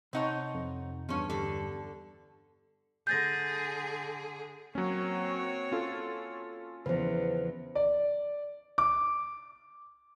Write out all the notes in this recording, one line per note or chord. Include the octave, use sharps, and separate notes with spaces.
C3 C4 D#4 C#5 F#5 A5
F2
E2 G2 F3 C#4
D3 G4 A4
D3 G#4 G6 A6 A#6
F#3 A#3 C4 C#4 F#4 C#5
C#4 F4 A4
E2 C#3 E3 F3 B4 C5
D5
D6